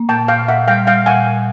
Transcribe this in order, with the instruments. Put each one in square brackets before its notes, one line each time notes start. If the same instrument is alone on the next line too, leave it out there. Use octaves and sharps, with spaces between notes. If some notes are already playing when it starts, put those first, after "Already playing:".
Already playing: [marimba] A#3
[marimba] A#2 [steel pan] G5 A5
[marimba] A#2 [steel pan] F5 G5
[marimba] A#2 [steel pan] E5 F#5
[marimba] G3 [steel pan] F5 G5
[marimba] G3 [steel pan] F5 G5
[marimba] A#2 [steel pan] F#5 G#5
[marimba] A#2